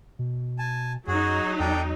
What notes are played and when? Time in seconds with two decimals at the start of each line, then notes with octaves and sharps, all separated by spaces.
0.19 B2
0.59 G#5 A5
1.07 F#2 F#3 D#4 F#4 G#4
1.60 E2 D4 A4 G5